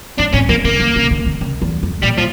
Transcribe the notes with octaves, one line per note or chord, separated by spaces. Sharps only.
G2 D4
A2 C#4
E3 A#3
C#3 A#3
D3
C#3
D3
D3
C#3
E2
F2
A#2 G3
F3